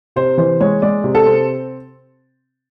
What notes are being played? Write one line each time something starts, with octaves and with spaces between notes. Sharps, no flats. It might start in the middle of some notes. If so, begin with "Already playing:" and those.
C3 C5
E3 C5
G#3 C#5
G#3 D5
C3
A4
C4